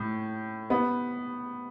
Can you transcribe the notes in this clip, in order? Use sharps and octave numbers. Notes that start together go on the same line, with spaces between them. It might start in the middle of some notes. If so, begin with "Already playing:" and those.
Already playing: A2
B3